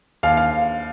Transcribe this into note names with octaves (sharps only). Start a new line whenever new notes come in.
D#2 F5
F5